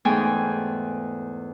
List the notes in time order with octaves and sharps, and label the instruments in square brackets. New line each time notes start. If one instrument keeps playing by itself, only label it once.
[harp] E2 G#2 A3 G5 G#5